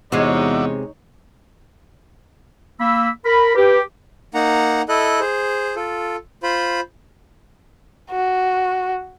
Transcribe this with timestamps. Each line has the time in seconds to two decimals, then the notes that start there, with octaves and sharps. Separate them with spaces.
0.12 E2 C3 G#3 D#4 F#4 C#5 D5 E5
2.80 A#3 B5 E6
3.25 A#4 B5
3.55 G4 B4
4.34 A#3 D#4 F#5 A#5
4.89 E4 A4 D#5 F#6
5.20 G#4 C5
5.76 F4 A4
6.43 F4 C5 B5
8.11 F#4